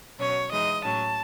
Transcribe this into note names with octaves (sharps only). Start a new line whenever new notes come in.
B2 F#3 C#4 C#5
E3 G#3 D#4 D#5
A2 F#3 C#4 A5